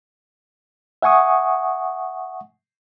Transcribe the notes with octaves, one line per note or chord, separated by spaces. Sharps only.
E5 F#5 G#5 C#6 D#6